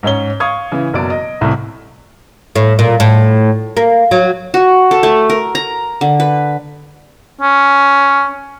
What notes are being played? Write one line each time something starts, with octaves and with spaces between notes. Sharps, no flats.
G#2 C#4 C#5 G7
F5 C#6 D#6 G#6
C#3 E3
F#1 B2 F#3 D5 D7
D#5
C2 A2 C3 A3
A2
A#2
A2
A#3
F#3
F#4
A4
A3
A#4
A#5
D3
B4
C#4